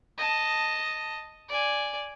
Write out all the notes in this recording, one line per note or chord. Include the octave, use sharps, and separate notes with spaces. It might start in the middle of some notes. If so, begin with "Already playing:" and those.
D#5 A5
D5 G#5